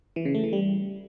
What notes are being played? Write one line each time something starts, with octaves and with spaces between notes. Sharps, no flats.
E3
C#3
A3
E3
G3